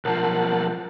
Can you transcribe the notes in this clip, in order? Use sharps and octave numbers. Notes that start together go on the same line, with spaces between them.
B1 F3 A#4 F#5 A5